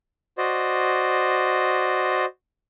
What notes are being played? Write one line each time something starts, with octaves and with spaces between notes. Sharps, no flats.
F#4 C5 D5 D#5